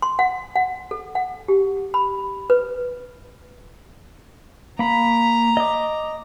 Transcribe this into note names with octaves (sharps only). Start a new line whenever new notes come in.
C6
F#5
F#5
A4
F#5
G4
B5
B4
A#3 A#5 B5
D#5 D6